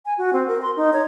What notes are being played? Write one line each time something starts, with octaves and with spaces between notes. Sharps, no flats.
G#5
F#4
C4
A#4
C6
D#4
C#5